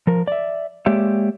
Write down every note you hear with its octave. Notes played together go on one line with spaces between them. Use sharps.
F3 A#4
D5 E5
G#3 A#3 G4 C#5 D5 E5